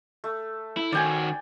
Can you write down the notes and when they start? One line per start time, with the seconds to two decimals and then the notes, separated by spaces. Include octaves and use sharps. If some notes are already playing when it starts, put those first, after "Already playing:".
0.24 A3
0.77 E4
0.92 D#3 F#4 D5 G5 G#5